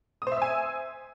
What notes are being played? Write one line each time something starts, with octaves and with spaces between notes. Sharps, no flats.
C5 E5 G#5 D#6 E6